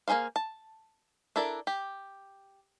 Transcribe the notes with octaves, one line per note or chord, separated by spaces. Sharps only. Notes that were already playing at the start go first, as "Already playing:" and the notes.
A#3 D4 G#4 C5 F5
A5
D4 E4 A4 A#4 D5
G4